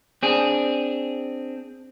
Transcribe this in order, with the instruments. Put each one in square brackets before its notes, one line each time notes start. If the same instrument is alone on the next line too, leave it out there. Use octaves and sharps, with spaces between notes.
[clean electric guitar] C4 D4 G#4